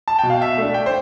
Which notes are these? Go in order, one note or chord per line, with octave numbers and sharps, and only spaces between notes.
A5
B2 G5
F5
E5
A3 D4
G5
C5